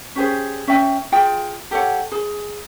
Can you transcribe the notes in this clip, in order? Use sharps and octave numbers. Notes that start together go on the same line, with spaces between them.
C#4 G4 G#4 C5
C#4 E5 G5
F4 G#4 G5
G4 A4 C#5 F#5
G#4